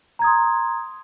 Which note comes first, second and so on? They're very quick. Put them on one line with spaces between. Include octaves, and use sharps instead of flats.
A#5 G#6 D#6 C6